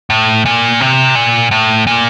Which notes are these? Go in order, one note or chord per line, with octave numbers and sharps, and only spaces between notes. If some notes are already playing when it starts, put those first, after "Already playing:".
A2
A#2
C3
A#2
A2
A#2